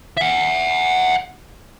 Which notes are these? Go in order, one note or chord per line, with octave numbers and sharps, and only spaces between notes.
E5 F#5